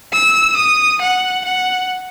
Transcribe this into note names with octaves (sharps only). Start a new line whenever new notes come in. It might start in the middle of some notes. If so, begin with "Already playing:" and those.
E6
D#6
F#5
F#5